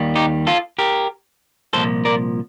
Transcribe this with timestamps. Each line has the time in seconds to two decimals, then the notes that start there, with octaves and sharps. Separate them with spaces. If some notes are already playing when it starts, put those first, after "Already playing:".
Already playing: D#2 D#3 G3
0.15 D#4 G4
0.47 F4 A4
0.79 G4 A#4
1.73 C2 A#2 F3 A4 C5
2.05 A#4 D5